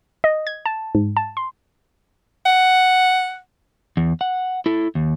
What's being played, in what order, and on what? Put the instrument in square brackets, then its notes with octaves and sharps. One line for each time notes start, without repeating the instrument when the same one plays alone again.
[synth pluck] D#5
G#6
A5
G#2
A5
C6
[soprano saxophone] F#5
[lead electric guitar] E2
F#5
E4 A4
D#2